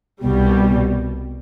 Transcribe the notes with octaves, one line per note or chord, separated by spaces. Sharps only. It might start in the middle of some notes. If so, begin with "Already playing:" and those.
C2 B2 G3